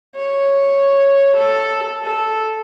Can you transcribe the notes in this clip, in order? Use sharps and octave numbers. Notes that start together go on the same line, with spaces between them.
C#5
A4
A4